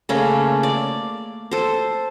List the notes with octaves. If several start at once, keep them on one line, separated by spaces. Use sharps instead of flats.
C#3 A3 A#3 C#4
D5
A4 C5